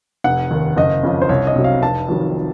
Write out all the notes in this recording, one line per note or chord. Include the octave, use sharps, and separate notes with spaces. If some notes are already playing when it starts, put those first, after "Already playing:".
F1 F#5
D#2 D#3
F#1 D#5
F2 C#3
C5
C2 C#5
D#5
C3 F#3
F5
F1 A5
F2 D#3 F#3